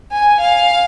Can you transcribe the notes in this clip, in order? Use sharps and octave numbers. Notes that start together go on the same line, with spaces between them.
G#5
F5